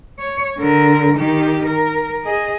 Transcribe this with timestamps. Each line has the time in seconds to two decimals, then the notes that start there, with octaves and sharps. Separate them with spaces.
0.19 C#5
0.58 D3 A#4
1.18 D#3 G4
1.66 A#4
2.24 G#4 D#5